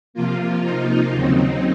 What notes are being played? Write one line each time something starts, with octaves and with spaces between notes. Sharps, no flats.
C3 F3 A#3 F4
D#4
D#2 C#3 F#3 C4